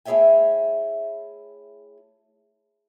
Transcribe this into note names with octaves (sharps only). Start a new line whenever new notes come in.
A3 E4 G#4 C#5 E5 G5